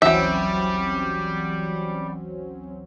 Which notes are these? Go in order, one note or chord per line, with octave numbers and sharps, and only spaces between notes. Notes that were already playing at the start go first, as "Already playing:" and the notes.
G#1 D2 E3 F#3 G3 C4 C#4 E5